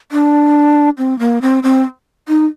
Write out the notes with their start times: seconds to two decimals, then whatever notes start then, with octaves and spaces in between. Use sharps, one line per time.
0.12 D4
0.98 C4
1.19 A#3
1.42 C4
1.63 C4
2.29 D#4